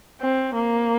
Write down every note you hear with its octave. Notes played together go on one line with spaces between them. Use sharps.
C4
A#3